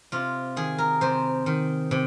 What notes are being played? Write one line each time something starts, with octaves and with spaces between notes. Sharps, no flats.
C3 F4
D#3 G#4
A#4
C3 C5
D#3
C3